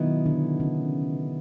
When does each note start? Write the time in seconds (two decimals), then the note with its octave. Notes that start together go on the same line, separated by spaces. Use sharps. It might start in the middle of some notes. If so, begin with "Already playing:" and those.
Already playing: B2 D#3 F#3 B3 D#4 E4
0.26 D3 D4
0.60 C#3 C#4